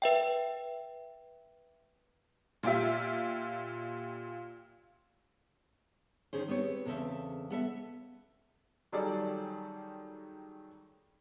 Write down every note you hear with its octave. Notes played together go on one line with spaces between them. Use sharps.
B4 E5 G5
A#2 F4 G4 E5
D#3 C#4 G#4 C5
B3 C4 G4 C#5
E2 C#3 C4 D4 A4 E5
B3 A4 E5
D#3 F#3 G3 G#4 A4 D5